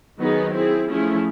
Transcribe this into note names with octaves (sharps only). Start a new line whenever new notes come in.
D#3 F#3 B3 D#4 G#4
C4 E4 G#4
F3 A3 C#4 E4 G#4